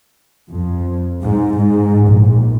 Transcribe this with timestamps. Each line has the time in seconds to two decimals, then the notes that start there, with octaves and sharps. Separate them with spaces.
0.52 F2
1.22 G#2
1.57 G#2
2.07 A#1